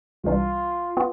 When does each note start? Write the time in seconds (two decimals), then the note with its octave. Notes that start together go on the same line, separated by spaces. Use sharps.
0.24 C2 C3 E3 G3 D4 F4
0.97 B3 F4